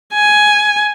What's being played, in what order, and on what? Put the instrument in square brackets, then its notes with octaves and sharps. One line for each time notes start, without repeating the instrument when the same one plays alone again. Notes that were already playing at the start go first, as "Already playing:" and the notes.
[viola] G#5